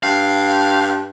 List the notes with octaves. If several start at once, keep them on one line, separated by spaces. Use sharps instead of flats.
G2 F5